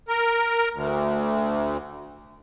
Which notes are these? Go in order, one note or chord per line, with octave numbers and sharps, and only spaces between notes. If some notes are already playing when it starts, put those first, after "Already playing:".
A#4
D2